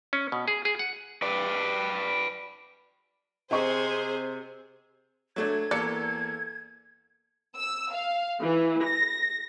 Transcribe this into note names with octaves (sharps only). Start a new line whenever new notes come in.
C#4
B2
G#4
G#4
F#5
B4 D5
C3 G#4 C5 D#5 C#6
F#3 A3 D4 G#6
E2 A#3 A4 D5 C#7
E6
F5
E3
A#6